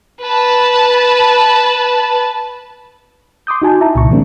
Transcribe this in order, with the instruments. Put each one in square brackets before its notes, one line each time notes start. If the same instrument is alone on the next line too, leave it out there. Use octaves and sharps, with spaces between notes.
[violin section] B4 A5
[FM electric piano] C6 D6 D#6 G6
D#4 F#4 G#5 A5
E4 E5 A5 A#5
C2 A#2 C#3 C#6
D#3 F3 G#3 A#3 C4 D4